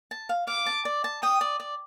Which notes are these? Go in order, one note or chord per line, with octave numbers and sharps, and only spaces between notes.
A5
F5
F5 D6
A5
D5
A5
G5 D#6
D5
D5